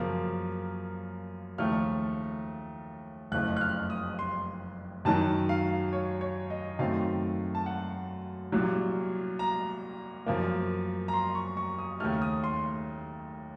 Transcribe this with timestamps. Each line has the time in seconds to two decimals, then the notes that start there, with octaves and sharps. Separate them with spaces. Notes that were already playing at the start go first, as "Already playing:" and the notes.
Already playing: F#2 C#3 F3 A#3
1.58 D#2 C#3 F3 A3 F6
3.32 F#1 F2 C#3 F3 A3 F#6
3.57 F#6
3.61 F6
3.90 D#6
4.19 C6
5.05 F#2 D#3 F#3 A5
5.49 F5
5.93 C#5
6.21 C#5
6.50 D#5
6.79 F#2 D#3 A3 C4 F5
7.55 A5
7.66 F#5
8.52 C2 A#2 F#3
9.39 A#5
10.26 F#2 F3 A#3
11.08 A#5
11.14 C6
11.35 C#6
11.57 C#6
11.78 D#6
12.00 D#2 C#3 A3 F6
12.22 D#6
12.44 C6